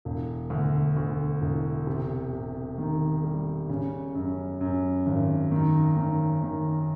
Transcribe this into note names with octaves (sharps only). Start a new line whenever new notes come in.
E1
D2
D2
E1
C3
C3
D#3
G3
C#3
F#2
F#2
G#1
D#3
D#3
D#3